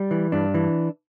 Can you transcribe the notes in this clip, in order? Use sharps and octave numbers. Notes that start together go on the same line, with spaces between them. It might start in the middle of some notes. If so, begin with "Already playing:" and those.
Already playing: G3
E3
G2 D4
E3